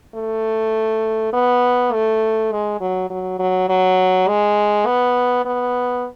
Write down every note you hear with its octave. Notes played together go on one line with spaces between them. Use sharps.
A3
B3
A3
G#3
F#3
F#3
F#3
F#3
G#3
B3
B3